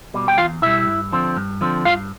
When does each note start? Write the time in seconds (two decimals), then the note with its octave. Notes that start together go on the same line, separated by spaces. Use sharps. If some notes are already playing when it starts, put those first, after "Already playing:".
0.14 B2 G3
0.28 G5
0.38 E2 F4 F5
0.62 B2 G3 E4 E5
0.87 G2
1.12 D3 F3 C4
1.37 G2
1.61 D3 F3 C4
1.85 G2 F4 F5